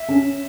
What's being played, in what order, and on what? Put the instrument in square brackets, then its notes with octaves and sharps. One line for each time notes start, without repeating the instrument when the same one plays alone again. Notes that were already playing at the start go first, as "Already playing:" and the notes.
Already playing: [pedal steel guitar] E5
[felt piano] C#4